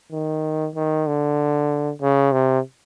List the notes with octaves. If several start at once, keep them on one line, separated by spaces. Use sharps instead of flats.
D#3
D#3
D3
C#3
C3